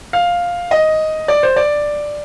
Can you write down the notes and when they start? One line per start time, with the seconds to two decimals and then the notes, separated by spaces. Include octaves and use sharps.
0.13 F5
0.71 D#5
1.28 D5
1.43 C5
1.56 D5